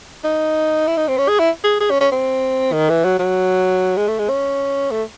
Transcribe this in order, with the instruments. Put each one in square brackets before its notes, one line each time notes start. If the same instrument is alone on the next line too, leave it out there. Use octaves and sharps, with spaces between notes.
[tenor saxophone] D#4
E4
D#4
C4
C#4
G#4
E4
G#4
G#4
C#4
C#4
C4
D#3
E3
F#3
F#3
G#3
A3
G#3
C#4
A3